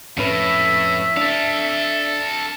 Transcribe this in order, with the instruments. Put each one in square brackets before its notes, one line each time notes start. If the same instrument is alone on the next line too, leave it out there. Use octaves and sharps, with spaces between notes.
[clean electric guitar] F2 C#4 B4 [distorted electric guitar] A2 [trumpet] E5
[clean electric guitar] D4 [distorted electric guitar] A4 F5